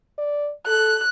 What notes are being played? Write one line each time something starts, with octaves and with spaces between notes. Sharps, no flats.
D5
A4 F#6